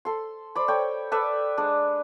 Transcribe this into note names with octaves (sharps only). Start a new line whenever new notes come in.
A4 C6
C5 D5 B5
A4 C#5 G5
A4 B4 D5 E5
G#3 D4